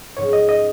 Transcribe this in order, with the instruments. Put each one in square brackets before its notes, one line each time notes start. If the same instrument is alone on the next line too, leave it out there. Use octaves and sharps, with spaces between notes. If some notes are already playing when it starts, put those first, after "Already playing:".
[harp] G#2 F#3 C#4 [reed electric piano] C#5
[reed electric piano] D#5
D#5